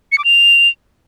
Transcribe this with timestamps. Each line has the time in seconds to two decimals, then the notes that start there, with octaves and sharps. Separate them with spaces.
0.12 C#7
0.18 D6
0.24 F7